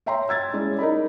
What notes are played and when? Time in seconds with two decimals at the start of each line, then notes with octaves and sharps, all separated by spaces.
0.06 C#5 E5 G5 A#5 C6
0.29 E6 G#6 A6
0.53 G#3 C#4 E4 D5
0.79 D#4 A#4 D#5 B5